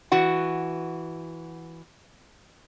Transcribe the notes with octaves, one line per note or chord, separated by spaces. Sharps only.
E3 F#4 F#5